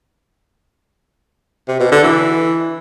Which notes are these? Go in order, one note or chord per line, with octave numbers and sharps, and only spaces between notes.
C3
B2
D3
E3